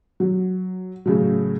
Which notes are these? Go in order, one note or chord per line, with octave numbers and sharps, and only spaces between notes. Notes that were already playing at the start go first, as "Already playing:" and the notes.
F#3
A2 C#3 F#3